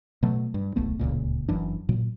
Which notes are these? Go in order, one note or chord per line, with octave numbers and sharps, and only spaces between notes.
B2 F#3 A3
G2
D1 B1 A3 B3
D1 G1 C#2 A#2
F#1 F#2 E3 D4
A#2 F#3